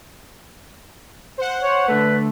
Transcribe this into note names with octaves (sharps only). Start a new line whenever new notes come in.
C5 F#5
C#5
D3 A3 B4